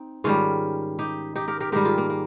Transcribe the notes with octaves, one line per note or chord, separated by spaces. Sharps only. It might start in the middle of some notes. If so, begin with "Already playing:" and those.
Already playing: C4 D#4
G#2 D#3 G3 C#4 F4
D#4 G4
D#4 G4
G4 A#4
G4 A#4
G#2 D#3 G3 G4 A#4
F4 G#4
A#3
A#3